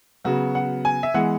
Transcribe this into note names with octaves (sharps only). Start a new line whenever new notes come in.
C#3 F#3 B3 F#4
F#5
G#5
E5
E3 G#3 B3 F#5